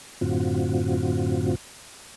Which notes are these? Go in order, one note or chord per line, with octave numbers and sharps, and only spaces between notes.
F#2 A2 D3 C4 F4 F#4